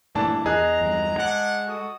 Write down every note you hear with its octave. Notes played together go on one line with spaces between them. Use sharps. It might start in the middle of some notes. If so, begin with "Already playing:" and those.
G2 A#2 E3 A3 D4 A5
E2 G#4 D#5 A#5 F#6
E2 G2
G#3 D4 F#5
F#4 A4 D#6